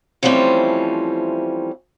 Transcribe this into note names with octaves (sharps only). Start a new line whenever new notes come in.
E3 F3 G3 A3 C4 C#4